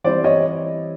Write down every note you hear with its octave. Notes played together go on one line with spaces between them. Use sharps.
E3 G3 C4 E4 C5 D5
C#5 D#5